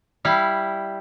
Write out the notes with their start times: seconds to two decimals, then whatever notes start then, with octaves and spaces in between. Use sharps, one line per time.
0.25 G3 E4 F5